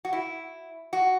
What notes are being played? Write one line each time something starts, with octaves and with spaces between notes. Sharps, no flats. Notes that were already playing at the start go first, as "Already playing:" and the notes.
F#4
E4
F#4